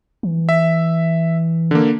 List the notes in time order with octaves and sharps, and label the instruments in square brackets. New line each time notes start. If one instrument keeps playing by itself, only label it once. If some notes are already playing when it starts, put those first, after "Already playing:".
[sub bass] E3
[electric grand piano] E5
D3 A#3